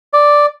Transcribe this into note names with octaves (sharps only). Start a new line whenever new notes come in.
D5